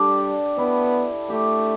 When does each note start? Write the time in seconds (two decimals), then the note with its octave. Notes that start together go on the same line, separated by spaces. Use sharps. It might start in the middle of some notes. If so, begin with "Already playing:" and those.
Already playing: G3 D4 G4 A4
0.57 B3 E4
1.30 A3 G4